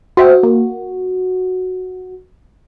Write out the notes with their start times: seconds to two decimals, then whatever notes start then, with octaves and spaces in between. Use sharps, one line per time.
0.17 F#4 C5 E5 G5
0.43 A#3